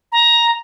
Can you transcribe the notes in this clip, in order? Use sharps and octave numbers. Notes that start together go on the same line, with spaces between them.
A#5